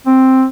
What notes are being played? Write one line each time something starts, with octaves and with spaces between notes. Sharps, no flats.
C4